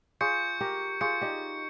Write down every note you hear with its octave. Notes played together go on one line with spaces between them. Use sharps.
F4 G#4 C#6 G6 C#7
G4 A#4
F4 G#4 C#6 G6 C#7
D#4 G4